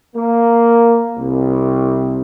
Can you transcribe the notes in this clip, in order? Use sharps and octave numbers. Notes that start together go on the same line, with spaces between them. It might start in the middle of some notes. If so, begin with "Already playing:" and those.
A#3
C2